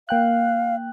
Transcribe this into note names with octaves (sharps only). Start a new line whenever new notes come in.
A#3 F5 G5 F#6